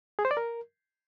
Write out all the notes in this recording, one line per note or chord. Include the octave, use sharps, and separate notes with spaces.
G#4
C5
D5
A#4